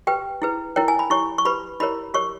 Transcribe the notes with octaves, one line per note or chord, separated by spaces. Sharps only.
G4 B4 G5
E4 G#4 B4
E4 A#4 C#5 G5
G#5
B5
E4 G4 C#5 C#6
C#6
G4 B4 B5
E4 G4 A#4 C#5 B5
G4 A#4 C#5 C#6